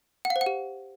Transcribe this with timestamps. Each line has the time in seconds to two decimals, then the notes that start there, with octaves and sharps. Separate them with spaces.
0.25 F#5
0.30 F5
0.36 C5
0.41 F#5
0.46 G4